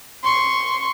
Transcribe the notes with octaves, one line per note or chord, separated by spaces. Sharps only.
C6 C#6